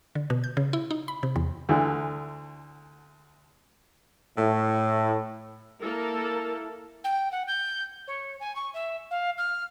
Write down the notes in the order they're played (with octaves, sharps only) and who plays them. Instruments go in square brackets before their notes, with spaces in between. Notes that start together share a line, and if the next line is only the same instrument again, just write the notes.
[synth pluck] D3
B2
G6
C#3
E4
D#4
B5
C3
E2
[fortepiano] D2 D3 E3
[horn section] A2
[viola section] A#3 A4 A#4 [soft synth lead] E4
[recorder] G5
F#5
G6
C#5
G#5
C#6
E5
F5
F6